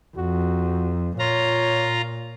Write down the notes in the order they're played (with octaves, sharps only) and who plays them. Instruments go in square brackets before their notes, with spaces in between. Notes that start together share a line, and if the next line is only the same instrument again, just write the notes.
[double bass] F2 [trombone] F#4
[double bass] A#2 [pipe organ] F4 A#5 [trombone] C#5